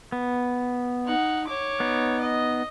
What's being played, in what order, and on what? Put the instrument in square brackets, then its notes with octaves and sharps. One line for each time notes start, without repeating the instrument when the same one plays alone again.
[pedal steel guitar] B3
[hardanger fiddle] D#4 F#5
C#5 D6
[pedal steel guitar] B3 D#4
[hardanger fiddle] D#5